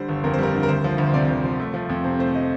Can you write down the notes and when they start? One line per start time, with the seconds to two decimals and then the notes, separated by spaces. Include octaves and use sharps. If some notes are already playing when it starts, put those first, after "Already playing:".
Already playing: D3 G3 C5
0.09 G1
0.24 F2 A#4
0.34 G3 C5
0.43 A#4
0.54 D3
0.63 A#4
0.68 D2 C5
0.84 F3
0.98 D2
1.14 C3 D5
1.29 D2
1.44 F3
1.59 A3
1.74 F3
1.89 F2
2.04 C3 C5
2.19 A3 C5
2.35 F3 D#5